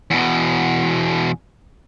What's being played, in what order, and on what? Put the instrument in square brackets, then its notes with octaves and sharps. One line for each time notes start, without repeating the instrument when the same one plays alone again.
[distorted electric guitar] E2 B2